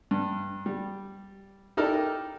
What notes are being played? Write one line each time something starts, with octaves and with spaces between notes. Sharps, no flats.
G2
G3
D#4 E4 G4 A4 A#4 D5